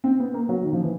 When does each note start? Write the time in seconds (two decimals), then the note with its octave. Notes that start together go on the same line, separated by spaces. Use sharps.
0.04 C4
0.20 B3
0.34 A#3
0.49 F#3
0.63 D#3
0.73 F3
0.83 E3